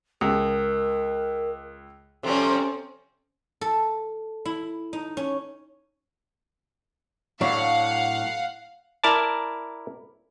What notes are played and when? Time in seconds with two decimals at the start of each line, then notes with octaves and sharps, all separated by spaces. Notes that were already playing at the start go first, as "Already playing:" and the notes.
0.21 C#2 A#4
2.23 C3 F3 G3 C4 C#4 A4
3.61 A4
4.45 E4
4.93 D#4
5.17 C#4
7.41 A2 F#3 D4 F5 F#5
9.04 E4 A#4 D5 A5